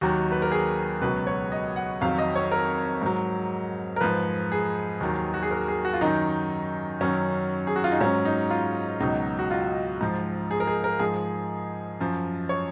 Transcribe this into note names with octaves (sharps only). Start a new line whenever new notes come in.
D#2 D#3 F#3 F#4
B4
A#4
G#4
C#2 B2 F#3 B4
C#5
D#5
F#5
F2 D#3 F#3 F5
D#5
C#5
A#4
G#2 F#3
A#4
G#2 F3 B4
G#4
D#2 D#3 F#3
F#4
G#4
A#4
G#4
F#4
F4
F#2 D#3 F#3 D#4
F#2 D#3 F#3 C#4
G#4
F#4
F4
D#4
G#2 F#3 C#4
D#4
F4
C#2 B2 F#3 D#4
F#4
F4
G#2 F3
G#4
A#4
G#4
A#4
G#2 F3 G#4
F#2 F3
C#5